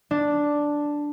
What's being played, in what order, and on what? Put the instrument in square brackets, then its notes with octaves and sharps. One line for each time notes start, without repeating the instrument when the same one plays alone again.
[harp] D4